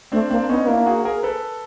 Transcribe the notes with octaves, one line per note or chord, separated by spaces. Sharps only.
A3 C4 D4
A#3 C4 D4
B3 C#4 D#4
B3
A#3 D4 E4
F#4 G#4
G#4 A#4
A4 B4